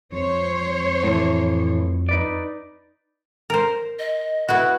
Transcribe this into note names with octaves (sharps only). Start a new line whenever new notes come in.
F2 C5 C#5
A2 E3
D#4 B4 D5
A#4 C5
D#5
B3 E4 F#4 F#6